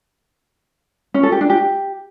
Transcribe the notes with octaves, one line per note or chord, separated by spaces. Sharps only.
C#4
A4
G4
D4
G4